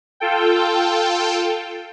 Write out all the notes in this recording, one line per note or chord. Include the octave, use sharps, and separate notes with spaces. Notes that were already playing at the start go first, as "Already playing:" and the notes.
F4 A4 G5